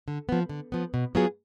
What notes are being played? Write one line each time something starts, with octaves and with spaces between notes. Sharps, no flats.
D3
F3 B3
D3
F3 B3
B2
F#3 B3 F4 G#4